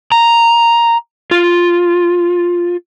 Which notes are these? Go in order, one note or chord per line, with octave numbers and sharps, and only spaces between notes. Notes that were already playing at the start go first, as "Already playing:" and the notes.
A#5
F4